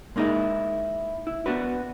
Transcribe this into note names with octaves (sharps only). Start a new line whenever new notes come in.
G#3 A#3 D#4 E4 G#4
E4
B3 D4 F#4 B4